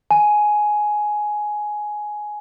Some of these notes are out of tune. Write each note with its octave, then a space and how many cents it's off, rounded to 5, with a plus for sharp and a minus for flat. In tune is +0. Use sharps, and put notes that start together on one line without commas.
G#5 +10